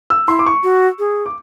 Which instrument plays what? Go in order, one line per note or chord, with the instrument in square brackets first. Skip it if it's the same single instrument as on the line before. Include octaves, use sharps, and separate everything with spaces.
[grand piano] E6
[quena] E4 [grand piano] C6
[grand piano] D6
C#6
[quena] F#4
G#4
[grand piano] D6